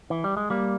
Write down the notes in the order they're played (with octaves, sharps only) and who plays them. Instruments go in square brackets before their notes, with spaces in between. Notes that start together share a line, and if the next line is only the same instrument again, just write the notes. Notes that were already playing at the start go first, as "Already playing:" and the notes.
[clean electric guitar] E3
G3
G#3
G3 A#3